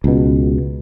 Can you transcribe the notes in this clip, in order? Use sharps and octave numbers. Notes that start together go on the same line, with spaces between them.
C#2 B2